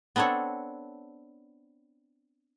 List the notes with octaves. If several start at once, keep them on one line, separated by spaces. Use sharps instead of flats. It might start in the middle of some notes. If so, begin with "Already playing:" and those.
B3 C4 D4 A4 C#5